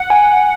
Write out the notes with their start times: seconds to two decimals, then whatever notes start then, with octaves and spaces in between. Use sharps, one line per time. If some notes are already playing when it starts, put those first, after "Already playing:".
Already playing: F#5
0.10 G#5